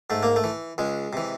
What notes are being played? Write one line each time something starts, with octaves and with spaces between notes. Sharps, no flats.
G#2 A3
A#3
A3
E3
C#2 G#3
C3 E3